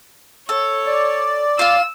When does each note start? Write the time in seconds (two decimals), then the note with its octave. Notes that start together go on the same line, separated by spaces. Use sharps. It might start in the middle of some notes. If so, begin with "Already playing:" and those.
0.49 A4 C#5
0.87 D5
1.59 F4 F5 E6